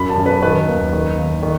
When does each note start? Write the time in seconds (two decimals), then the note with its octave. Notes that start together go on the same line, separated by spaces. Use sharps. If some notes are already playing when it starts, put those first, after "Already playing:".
Already playing: F#2 B5
0.09 A5
0.18 F#2
0.26 B4
0.42 D#3 B4
0.68 D#2
0.93 D#3
1.18 D#2
1.42 D#3